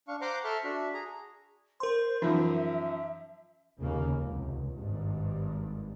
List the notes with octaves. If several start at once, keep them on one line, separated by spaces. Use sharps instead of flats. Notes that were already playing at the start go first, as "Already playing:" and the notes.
D4 F5 C#6
C5 F#5 A#5 C6 D6
A4 E5 C6 C#6 F6
D4 F#4 E5
G#4 A#5
A#4 C5 C6
F#2 E3 F3 D#4 E5
F1 D#2 C#3 A#3
F1 C#2
G#1 G2